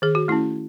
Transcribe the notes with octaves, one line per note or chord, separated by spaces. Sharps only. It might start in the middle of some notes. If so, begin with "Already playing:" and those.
D#3 G#4
F#4
A3 C#4 E4